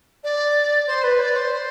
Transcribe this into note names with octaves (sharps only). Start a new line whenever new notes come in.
D5
C5
B4
D5
C5